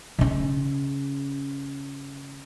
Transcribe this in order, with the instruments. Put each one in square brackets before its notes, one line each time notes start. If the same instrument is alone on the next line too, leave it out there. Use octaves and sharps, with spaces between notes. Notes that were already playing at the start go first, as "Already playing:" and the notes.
[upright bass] C#3 C#4